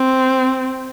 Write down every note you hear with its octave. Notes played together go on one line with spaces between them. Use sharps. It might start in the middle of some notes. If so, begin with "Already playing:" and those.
Already playing: C4